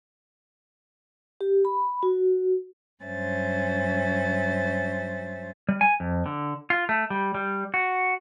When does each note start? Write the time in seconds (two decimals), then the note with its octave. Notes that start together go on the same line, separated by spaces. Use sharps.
1.41 G4
1.65 B5
2.03 F#4
3.03 G2 F#3 C#4 C5 E5 A6
5.69 G3
5.81 G#5
6.00 F2
6.26 D3
6.70 F4
6.89 A3
7.10 G3
7.35 G3
7.74 F#4